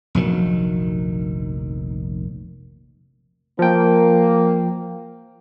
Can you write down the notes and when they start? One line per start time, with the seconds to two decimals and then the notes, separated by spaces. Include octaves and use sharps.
0.15 F1 A#1 D#3 F#3
3.59 F3 A#3 G5